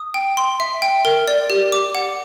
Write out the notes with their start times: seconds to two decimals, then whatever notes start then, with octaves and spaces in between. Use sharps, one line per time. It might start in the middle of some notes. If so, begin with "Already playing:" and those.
Already playing: D#6
0.14 G5
0.37 C6
0.60 E5
0.82 G5
1.05 A#4
1.28 D5
1.50 G4
1.72 D6
1.95 F#5